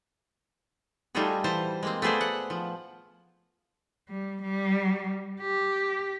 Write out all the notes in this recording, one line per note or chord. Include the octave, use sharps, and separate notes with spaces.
G3 A3 D#4 F4 F#4 G#4
E3 C5 A5 A#5
G#3 A#3 C4
A3 B3 G#4 C5 D5
F#5
F3
G3
G3
G4